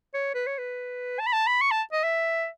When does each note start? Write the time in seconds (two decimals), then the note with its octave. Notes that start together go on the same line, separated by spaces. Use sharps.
0.14 C#5
0.35 B4
0.47 C#5
0.58 B4
1.19 A5
1.27 B5
1.33 A5
1.47 B5
1.61 C#6
1.71 A5
1.92 D#5
2.04 E5